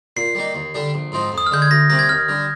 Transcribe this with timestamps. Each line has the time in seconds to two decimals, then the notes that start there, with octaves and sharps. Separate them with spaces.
0.17 A#2 C7
0.35 G3 A#3 D#4
0.55 D#2
0.74 D3 G3 D4
0.94 A#1
1.12 G#2 F3 C4 D#4
1.32 F2
1.38 D#6
1.46 F6
1.51 D3 G#3 G6
1.62 G#6
1.70 D2 A#6
1.89 C3 G3 A#3 A#6
1.99 G#6
2.09 D#2 F6
2.28 D3 G3